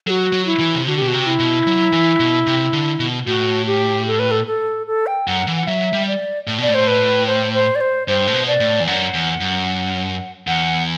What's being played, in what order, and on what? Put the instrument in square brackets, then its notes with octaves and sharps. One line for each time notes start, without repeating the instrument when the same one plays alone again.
[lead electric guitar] F#3 [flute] F#4 A4
[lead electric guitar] F#3
[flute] E4
[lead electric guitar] E3
C3
[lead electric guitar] D3 [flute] F#4
[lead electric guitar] B2 [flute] G4
[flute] F#4
[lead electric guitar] C3
[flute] E4
[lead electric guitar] B2
F#3
E3
B2
C3
D3
B2
[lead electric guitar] A2 [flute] F#4
[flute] G4
A4
B4
A4
A4
A4
G5
[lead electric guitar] F#2 [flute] F#5
[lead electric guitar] E3
[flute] F#5
[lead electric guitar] F#3 [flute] E5
[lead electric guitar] G3
[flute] D5
[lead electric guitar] A2
[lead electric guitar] B2 [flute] D5
[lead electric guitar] A2
[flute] C5
B4
C5
C5
D5
C5
[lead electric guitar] G2 [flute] C5
[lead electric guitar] A2
B2
[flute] D5
[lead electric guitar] A2
E2
[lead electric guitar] F#2 [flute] F#5
[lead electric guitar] E2
F#2
[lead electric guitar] E2 [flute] F#5